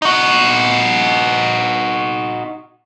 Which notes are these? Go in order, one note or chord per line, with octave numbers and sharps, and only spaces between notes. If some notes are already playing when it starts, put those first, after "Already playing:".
D#4 F#4